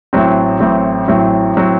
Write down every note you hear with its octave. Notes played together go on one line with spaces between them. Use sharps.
A1 A2 F#3 C4
A1 A2 F#3 C4
A1 A2 F#3 C4
A2 F#3 C4